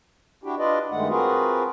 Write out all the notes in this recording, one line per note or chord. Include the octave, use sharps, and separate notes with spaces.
D4 E4 F#4 G4
D4 F4 B4 D5 D#5
G2 D#3 G#3 A3 F#5
C4 F4 F#4 G#4 A#4 B4